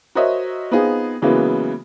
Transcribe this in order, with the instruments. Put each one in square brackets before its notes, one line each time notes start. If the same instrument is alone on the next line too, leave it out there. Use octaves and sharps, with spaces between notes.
[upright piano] F#4 A#4 C5 C#5 D#5 E5
B3 C4 D#4 F4 G#4
C#3 E3 F#3 G#3 A#3 B3